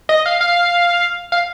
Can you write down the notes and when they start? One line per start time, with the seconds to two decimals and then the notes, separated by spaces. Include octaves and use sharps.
0.09 D#5
0.26 F5
0.41 F5
1.32 F5